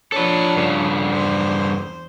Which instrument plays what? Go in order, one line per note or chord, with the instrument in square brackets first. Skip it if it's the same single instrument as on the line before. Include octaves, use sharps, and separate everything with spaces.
[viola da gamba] F3 D4 C#5 [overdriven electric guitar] A4 B4
[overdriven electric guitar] G2 C#3
[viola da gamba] E2 C5